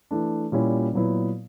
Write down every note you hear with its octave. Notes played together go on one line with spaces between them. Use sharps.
E3 A3 D4
A#2 G3 A#3 C#4 E4
A#2 F#3 B3 E4